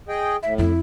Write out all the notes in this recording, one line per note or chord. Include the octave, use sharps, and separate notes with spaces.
G#4 D#5 G5
A2 E5
F2 B3 E4